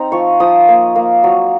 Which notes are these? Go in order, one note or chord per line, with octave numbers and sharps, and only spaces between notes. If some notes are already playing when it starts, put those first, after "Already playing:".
Already playing: C4 D#4 A#5
F3 C#6
F3 D#6
A#3
A#3
F#3